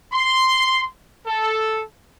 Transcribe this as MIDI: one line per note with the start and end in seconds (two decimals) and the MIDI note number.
0.13 0.88 84
1.27 1.82 69